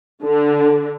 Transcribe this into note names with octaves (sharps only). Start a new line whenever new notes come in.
D3